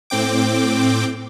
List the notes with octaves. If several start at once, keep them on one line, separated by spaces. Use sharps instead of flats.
A2 C4 G5 D6